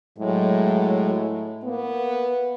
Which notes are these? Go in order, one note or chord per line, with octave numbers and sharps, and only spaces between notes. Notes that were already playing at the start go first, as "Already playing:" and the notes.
A2 F#3 G#3
A#3 B3